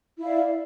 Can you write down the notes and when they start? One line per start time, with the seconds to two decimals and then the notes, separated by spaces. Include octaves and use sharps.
0.19 E4
0.23 F5
0.26 D5